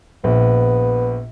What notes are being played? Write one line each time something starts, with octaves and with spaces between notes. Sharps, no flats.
A#1 B3